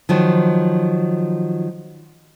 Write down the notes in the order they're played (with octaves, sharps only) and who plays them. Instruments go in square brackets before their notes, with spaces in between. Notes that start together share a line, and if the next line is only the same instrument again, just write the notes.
[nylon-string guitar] D#3 F3 F#3